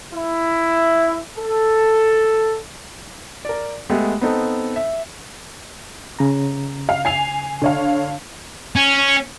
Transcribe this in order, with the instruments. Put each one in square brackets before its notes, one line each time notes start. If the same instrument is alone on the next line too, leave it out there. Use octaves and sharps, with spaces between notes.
[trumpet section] E4
A4
[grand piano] A#4 D5
G#3 A3 B3 G4
B3 C4 D#4 A4
E5
[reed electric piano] C#3 A#5
[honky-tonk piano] F5
G#5 C7 F7
D3 C#5 F5
[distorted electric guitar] C#4